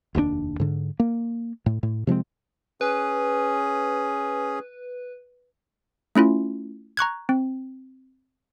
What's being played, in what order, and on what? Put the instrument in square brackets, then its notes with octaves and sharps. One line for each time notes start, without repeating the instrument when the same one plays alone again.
[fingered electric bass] F1 D#2 G#2 D4
G#2 D3
A#3
A2
A2
C3 F3 G#3 C4
[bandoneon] C#4 G#4 [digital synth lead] B4
[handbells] A3 C#4 E4 F4
A#5 C#6 F#6 G#6
C4